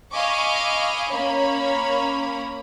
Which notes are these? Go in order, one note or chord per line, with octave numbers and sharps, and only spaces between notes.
D#5 F5 G#5 B5 C#6 D6
A#3 C#4 C#5 B5